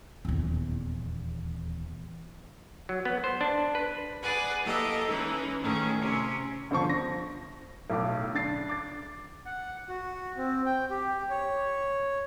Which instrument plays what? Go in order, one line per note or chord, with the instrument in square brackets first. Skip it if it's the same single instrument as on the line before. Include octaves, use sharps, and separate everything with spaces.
[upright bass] D#1 E2
[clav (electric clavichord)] F#3
B3
C5
D4
B4
[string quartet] G#4 B4 D5 F#5 G#5
A#3 E4 G4 A4 D#5 E5
E3 G#3 C#4 D#4 B4
A2 D#3 A3 C#4 G#4
C3 C#4 E4
[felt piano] G1 D3 F3 C5 A5 C#6
A#6
B1 A2 E5 D6
D3 D4 A6 C7
D6 A6
[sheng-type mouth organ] F#5
F#4
C4
G5
G4
C#5